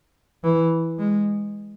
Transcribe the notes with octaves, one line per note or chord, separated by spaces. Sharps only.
E3
G#3